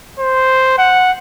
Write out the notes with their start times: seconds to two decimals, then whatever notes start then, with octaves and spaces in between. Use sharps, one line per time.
0.19 C5
0.78 F#5